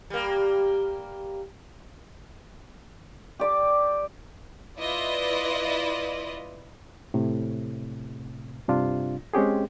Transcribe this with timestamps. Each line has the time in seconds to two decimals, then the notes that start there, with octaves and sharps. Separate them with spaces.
0.10 G3 A#3
3.40 G4 D5 D6
4.78 E4 F4 B4 D5 D#5
7.14 A2 C3
8.68 G2 C3 D4 F4
9.34 G#3 C4 C#4 G4 G#4